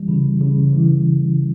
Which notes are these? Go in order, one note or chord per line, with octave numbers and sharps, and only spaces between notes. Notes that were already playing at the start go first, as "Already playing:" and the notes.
Already playing: E3 G3
C#3
C#3
E3